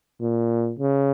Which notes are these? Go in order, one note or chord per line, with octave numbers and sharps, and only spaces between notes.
A#2
C#3